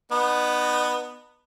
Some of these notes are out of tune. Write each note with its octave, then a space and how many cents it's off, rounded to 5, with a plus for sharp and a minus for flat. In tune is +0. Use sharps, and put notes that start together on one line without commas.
B3 +0 D#4 -35